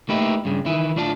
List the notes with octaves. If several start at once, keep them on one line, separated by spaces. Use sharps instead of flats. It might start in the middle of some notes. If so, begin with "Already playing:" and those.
A3 A#3 D#4 E4 G4 B4
G2 C#3
D#3 E3 E4
D2 A2 D4 F4 G#5 A5